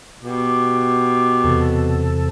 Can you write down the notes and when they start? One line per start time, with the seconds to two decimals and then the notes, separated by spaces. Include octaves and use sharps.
0.23 B2 G4 D6
1.44 E2 C3 A4